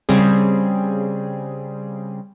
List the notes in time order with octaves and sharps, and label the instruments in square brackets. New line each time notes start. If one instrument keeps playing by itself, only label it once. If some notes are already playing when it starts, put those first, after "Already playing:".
[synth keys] C#3 G3 C4 G#4